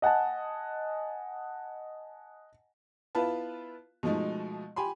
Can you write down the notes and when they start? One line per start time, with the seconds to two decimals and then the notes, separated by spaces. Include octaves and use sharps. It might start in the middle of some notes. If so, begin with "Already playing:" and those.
0.02 D#5 F#5 G#5 A5
3.15 B3 E4 F4 B4 A5
4.03 B2 F3 G#3 A3 D#4
4.76 G4 G#5 B5 C6